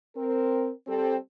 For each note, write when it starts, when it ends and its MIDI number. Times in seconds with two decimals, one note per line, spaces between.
0.16 0.70 60
0.16 0.70 70
0.87 1.16 55
0.87 1.16 60
0.87 1.16 69